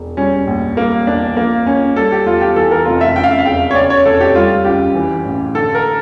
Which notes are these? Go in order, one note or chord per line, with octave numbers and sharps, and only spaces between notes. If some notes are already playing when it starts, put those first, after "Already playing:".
Already playing: E1
G3 C#4
A#1
G3 A#3
E2 D4
F3 A#3
C#2 C#4
G3 A4
G4
E2 F4
G4
E3 A4
A#4
F1 F4
E5
C#3 G5
F5
E5
F5
E1 G5
C#5
C#3 D5
C#5
F1 A4
G4
G3 F4
C#2 G4
E3
A1
D3 A4
A#4